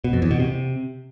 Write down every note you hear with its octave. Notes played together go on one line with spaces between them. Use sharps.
B2
F2
E2
B2
C3